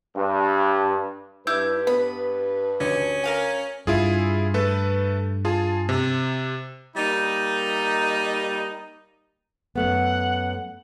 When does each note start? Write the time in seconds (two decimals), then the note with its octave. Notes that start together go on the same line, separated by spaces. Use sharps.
0.15 G2
1.47 G2 E4 B4 D6 G6
1.87 B3 B5
2.80 D2 C#4
3.24 A#4 F5 G#5
3.87 G2 E4 F4 G#4
4.54 A3 A4 B4
5.45 F4 G#4 A5
5.89 C3
6.97 G3 A#3 D#4
9.76 F#2 A3 B3 F#5